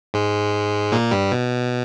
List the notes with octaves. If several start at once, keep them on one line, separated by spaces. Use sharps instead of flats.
G#2 G#3
A#2 A#3
G2 G3
B2